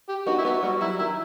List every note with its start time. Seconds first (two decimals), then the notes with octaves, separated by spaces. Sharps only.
0.09 G4
0.27 B3 D#4 F#4
0.38 E4
0.45 B3 F#4
0.63 G3 F#4
0.81 F#3 E4
0.99 D#3 E4